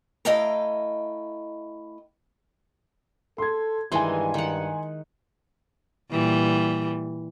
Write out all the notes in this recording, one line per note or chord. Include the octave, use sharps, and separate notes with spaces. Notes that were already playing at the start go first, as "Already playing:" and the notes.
A3 E4 D#5 F5 G5 A#5
A4 C6 G#6
G2 D#3 E3 G#3 G#5 C6
D#3 F#5
A#2 E3 G3